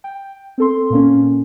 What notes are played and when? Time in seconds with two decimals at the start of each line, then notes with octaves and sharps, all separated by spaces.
0.04 G5
0.58 C4 A4 C6
0.90 A#2 A#3 C#4